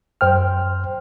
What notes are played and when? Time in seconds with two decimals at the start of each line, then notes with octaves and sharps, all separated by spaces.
0.21 F#2 C5 G5 F6